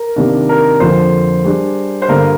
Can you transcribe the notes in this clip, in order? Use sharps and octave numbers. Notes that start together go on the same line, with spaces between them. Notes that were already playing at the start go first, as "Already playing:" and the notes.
Already playing: A#4
C3 D#3 A#3 D4
A#4
F2 D3 F3 A#3 F4 C5
G3 D4 G#4
C5
G2 D3 G3 A#3 A#4